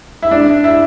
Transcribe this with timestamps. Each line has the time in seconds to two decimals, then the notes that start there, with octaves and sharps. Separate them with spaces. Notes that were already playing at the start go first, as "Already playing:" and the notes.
0.22 E4
0.31 D4
0.64 E4